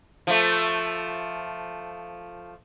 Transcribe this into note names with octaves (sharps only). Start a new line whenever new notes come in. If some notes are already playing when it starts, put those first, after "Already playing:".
F3 A3